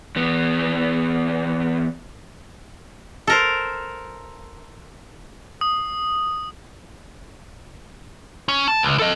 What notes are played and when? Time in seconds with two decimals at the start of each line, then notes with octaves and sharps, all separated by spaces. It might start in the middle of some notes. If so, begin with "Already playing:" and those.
0.16 E2 B3
3.27 A4 A#4 C5
5.61 D#6
8.48 C#4
8.68 A5
8.83 C#2
8.99 A4 D#5